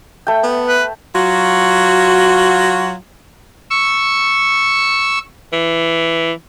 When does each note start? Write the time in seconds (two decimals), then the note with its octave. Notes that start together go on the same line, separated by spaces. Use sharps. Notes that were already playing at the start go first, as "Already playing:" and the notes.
0.27 A3 G5
0.43 B3
0.68 B4
1.15 F#3 F4 F#4
3.70 C#6 E6
5.53 E3